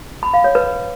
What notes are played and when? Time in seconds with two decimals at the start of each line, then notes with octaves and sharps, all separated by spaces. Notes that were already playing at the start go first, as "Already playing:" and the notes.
0.23 B5
0.34 F5
0.44 C#5
0.55 B4